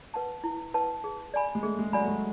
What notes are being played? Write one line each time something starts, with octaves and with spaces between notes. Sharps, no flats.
B4 F#5 A5
E4
B4 F#5 A5
G#4
D5 G#5 B5
G#3
A3 G#4
G#3
F#3 D5 G#5 B5
A3
G#3